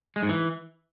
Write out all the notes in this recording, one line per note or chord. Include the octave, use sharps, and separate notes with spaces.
G#3
G#2
E3